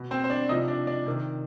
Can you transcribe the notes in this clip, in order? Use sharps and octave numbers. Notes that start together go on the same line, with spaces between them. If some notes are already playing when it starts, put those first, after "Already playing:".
Already playing: B2
C4 C5
C5
D4 D5
C3 F3 D#4 D#5
D4 D5
D4 D5
C3 D#3